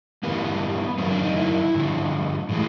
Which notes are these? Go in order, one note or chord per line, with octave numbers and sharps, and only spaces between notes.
G2 E3 G3 A#3 B3
F#2 D#3 F#3 A#3 C4
D4
D#4
E4
G2 D3 F3
A2 E3 G#3